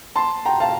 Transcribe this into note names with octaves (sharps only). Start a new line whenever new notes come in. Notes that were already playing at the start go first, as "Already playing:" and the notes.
A5 C6
G5 A#5
F5 A5